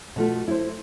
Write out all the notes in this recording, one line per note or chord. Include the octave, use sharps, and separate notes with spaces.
B2 A3 F4
E4 C5